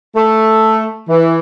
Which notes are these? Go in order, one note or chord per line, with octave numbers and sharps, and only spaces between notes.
A3
E3